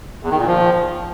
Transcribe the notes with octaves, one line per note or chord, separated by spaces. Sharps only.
E2
D#3
A#2
F3